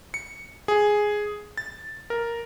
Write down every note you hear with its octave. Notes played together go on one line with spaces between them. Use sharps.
C#7
G#4
A6
A#4